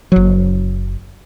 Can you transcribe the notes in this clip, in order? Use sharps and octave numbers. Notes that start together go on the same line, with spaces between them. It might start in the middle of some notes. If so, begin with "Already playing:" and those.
F#1 F#3